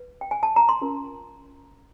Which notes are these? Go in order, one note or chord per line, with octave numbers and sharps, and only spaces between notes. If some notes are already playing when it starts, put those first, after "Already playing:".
Already playing: B4
G5
G#5
A5
A#5
C6
C#4 F4 A#4